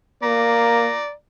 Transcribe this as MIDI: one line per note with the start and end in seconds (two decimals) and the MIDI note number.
0.23 0.91 58
0.23 1.11 74
0.23 1.11 82